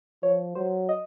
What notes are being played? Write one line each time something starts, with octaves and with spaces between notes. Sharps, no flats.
F3 C#5
F#3 C5
D#5